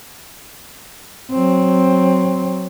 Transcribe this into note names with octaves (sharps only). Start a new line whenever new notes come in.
F#3 C4